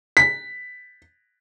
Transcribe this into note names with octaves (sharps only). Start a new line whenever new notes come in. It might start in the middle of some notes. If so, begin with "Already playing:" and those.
B6